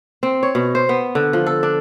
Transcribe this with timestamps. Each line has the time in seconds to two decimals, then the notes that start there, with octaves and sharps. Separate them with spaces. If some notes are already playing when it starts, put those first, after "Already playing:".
0.23 C4
0.43 C#5
0.55 B2
0.75 C5
0.89 B3
1.15 D3
1.33 F3
1.46 A4
1.63 D4